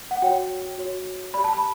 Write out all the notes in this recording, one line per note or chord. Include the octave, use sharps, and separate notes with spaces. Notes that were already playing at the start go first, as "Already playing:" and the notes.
F#5
F#4 C#5 G5
F#4 C#5
G4 D5 B5
A5
B5